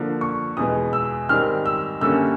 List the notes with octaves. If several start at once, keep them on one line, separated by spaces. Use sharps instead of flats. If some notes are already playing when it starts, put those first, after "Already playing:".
Already playing: D3 F3 A#3
C#6
E2 B2 G#3 D#6
E6
G#2 D#3 G3 C4 F6
E6
F#2 D3 G3 A#3 C#4 E6